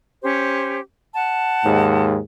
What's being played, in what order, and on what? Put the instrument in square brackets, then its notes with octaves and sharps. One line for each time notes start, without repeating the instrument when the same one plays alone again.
[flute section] C#4 G4 C5
F#5 A5
[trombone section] D#2 G#2